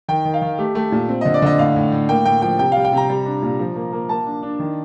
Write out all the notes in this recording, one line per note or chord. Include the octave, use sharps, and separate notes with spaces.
D#3 G5
D#3
F5
D#3
A3 G4
A3 G4
A#2
C4
D#5
D3
D5
D3 D#5
A2 F5
A2
A2
A#3 G5
A2 G5
F3 G5
C3 G5
F5
G3
G5
C3 A#5
G3
D4
A#2
F3
A#3
A#3
A#3 A5
D4
D4
D#3